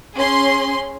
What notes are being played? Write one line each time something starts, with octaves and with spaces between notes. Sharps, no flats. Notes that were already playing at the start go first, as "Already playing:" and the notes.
C#4 G#4 C6